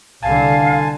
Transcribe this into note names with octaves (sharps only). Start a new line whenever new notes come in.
C2 D3 F5 G#5 A5